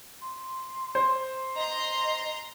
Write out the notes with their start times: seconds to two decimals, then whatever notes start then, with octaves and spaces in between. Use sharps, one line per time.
0.22 C6
0.95 C5
1.56 D#5 A#5 C6